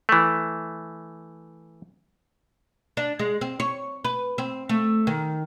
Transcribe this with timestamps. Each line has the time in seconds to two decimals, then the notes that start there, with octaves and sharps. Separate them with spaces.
0.09 E3 A3
2.97 D4
3.20 G#3
3.41 C4
3.60 C#5
4.04 B4
4.38 C4
4.69 A3
5.07 D#3